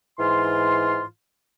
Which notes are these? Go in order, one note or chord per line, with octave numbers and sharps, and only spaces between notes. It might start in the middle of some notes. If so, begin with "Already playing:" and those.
G#2 E3 F4 C6